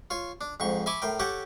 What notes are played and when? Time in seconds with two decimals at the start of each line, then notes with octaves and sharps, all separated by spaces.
0.10 F4 C#5
0.41 D4
0.60 F2 G#2 C#6
0.86 E5 G#5 B5 C#6 D6
1.02 A2 A#4 G5
1.19 G4 A4 C#5 F#5 G5